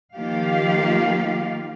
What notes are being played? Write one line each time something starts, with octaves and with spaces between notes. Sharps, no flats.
D#3 F3 A#3 F4 G4 F5